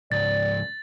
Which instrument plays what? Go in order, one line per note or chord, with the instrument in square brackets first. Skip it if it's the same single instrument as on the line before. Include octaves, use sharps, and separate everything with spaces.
[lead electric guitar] C#2 G#2 [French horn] D5 [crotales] A6